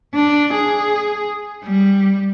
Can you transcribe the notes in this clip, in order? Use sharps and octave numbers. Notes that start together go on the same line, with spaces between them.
D4
G#4
G3